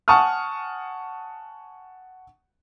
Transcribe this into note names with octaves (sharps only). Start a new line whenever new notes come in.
F#5 G#5 A5 C#6 D#6 F6